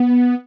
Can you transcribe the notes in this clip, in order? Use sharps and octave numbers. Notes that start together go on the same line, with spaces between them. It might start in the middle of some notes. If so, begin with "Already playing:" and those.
Already playing: B3